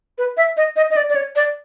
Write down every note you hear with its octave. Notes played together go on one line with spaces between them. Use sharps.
B4
E5
D#5
D#5
D#5
D5
D5
C#5
D5